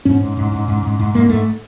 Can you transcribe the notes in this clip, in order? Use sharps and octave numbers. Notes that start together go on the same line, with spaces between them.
G#2 C#4
G#2
G#2
G#2
G#2
G#2
G#2
G#2 A#3
G#2 A3